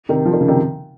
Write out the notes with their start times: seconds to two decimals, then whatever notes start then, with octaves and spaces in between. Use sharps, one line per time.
0.09 C3 D#3
0.26 F3
0.33 D#3
0.41 C#3
0.48 C3 D#3